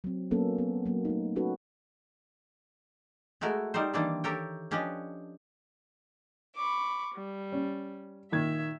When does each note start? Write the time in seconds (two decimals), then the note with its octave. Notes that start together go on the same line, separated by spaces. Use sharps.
0.04 F#3 C4
0.31 F#3 A#3 B3 C#4 A4
0.58 B3
0.85 F#3 A#3
1.05 A3 D#4
1.36 C#4 D#4 F#4 A4 B4
3.41 G#3 A3 E4 F#4 A#4
3.74 G3 D#4 A#4 C5
3.94 D#3 E3 G3 A#3 C4 D4
4.24 G4 A4 A#4 C#5 G5
4.71 F3 C#4 D4 G4 B4 D#5
6.56 B5 C#6 D6
7.14 G3
7.52 C#4
8.32 A#2 D#3 E5 G#6